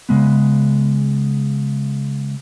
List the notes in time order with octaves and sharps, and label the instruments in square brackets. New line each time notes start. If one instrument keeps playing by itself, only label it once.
[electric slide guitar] C#3 G#3 B3